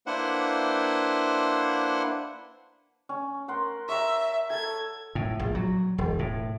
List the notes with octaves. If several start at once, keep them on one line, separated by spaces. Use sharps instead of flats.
A#3 D4 E4 B4 C5 F#5
C#4
A#4 F#5 C6
C#5 E5 A#5
A4 G#6
A2
A#1
F#3
E1
A2